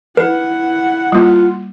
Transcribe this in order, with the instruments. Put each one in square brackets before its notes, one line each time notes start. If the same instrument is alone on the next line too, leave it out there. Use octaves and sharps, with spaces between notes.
[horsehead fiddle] E4 F#5 [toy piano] B4
[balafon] G3 A#3 [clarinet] F4